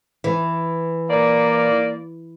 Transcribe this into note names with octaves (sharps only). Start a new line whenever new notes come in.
E3
A#3 D5